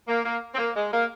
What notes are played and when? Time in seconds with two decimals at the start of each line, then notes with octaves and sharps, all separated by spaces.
0.08 A#3
0.25 A#3
0.54 C4
0.59 A#3
0.76 G#3
0.93 A#3